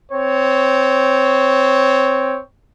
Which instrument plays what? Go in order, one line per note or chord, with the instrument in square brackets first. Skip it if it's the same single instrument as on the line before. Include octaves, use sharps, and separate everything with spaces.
[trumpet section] C4 C#5